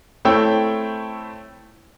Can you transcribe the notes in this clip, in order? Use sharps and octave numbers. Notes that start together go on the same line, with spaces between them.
A3 C4 E4 C#5 G5 E6